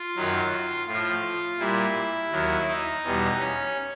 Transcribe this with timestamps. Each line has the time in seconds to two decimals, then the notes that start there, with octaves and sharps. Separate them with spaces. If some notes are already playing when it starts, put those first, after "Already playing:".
Already playing: F4
0.16 F#2 D#3 F#3
0.87 A2 F3 F4
1.59 A#2 G3 E4
2.31 D#2 D#3 F#3
2.67 D#4
3.03 E2 B2 G3
3.39 C#4